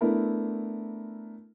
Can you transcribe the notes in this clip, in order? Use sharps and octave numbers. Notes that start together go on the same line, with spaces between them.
A3 B3 D4 E4 A#4